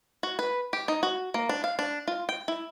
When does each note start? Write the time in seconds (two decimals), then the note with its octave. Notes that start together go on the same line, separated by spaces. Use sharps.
0.23 F#4
0.39 B4
0.73 G4
0.88 D#4
1.03 F#4
1.34 A#3
1.49 D4
1.64 F5
1.79 D4
2.08 F4
2.29 G5
2.48 E4